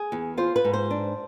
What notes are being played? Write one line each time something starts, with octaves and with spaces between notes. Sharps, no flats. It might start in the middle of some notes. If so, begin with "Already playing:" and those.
Already playing: G#4
E2
F4 C5
B4
G#2
C5
D4